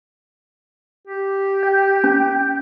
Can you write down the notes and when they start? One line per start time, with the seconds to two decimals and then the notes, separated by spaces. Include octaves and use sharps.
1.07 G4
1.63 G5
2.04 C#4